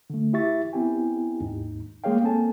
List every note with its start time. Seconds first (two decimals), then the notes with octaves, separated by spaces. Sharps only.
0.10 D3 A3
0.33 E4 G4 E5 C#6 A6
0.73 B3 C4 E4 G4 G5 G#5
1.41 D#2 G#2 D#4
2.04 G#3 A#3 G#4 C#5 F5 G5
2.23 A#3 C4 A4 G#5 A5